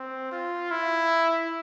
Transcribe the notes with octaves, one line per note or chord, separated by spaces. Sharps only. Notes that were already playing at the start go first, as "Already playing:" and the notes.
Already playing: C4
F4
E4